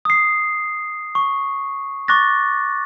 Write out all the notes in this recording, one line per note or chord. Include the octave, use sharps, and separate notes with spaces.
D#6 C7
C#6
C#6 D6 F#6 A6 A#6